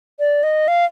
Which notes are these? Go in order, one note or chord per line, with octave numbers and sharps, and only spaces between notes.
D5
D#5
F5